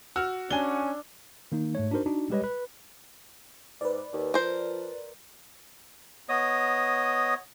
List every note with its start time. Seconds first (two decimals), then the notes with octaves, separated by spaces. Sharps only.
0.16 F#4 E6 F6
0.51 C#4 D4 G#5 G7
1.52 D#3 A#3 D#4
1.75 G#2 A3 C#5
1.91 D4 D#4 F#4 A#4 C5
2.06 D4 D#4 F#4
2.30 G3 G#3 G4 B4 C#5 D#5
2.43 B4
3.81 G#2 B4 D5
4.13 D#2
4.34 F3 A#4 C5
6.29 B3 C#5 D#5 D#6